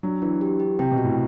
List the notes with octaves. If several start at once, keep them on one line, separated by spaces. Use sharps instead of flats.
F#3 D4
E3 D4
G4
G4
C3 G5
B2
F#4
A2